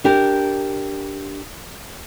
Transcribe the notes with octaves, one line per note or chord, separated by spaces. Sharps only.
D4 G4 A#4